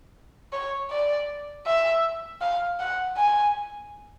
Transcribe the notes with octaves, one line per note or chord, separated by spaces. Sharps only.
C#5
D5
E5
F5
F#5
G#5